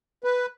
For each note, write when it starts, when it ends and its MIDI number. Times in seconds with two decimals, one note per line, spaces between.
0.24 0.46 71